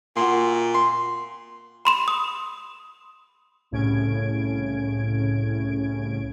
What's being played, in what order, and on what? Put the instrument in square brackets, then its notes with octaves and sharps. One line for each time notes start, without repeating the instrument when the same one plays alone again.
[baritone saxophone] A#2 [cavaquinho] F#4 E5 C6
[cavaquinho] C6
[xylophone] B5 C6 E7
D#6
[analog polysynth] C2 A2 C#3 C#4 G#6 D7